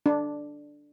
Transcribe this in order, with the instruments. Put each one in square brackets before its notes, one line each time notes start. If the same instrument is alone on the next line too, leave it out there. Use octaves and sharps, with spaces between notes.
[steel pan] D4